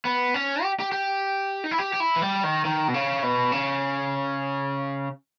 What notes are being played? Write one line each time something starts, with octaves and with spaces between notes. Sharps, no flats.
B3
C#4
G4
G4
G4
D#4
E4
G4
G4
E4
E3
G3
D#3
D#3
B2
C#3
B2
C#3